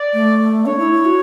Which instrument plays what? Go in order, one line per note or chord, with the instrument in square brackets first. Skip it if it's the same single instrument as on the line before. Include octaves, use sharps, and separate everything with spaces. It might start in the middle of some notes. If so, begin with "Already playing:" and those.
Already playing: [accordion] D5
[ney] A3
[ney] D4 [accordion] C#5
[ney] E4
E4
F#4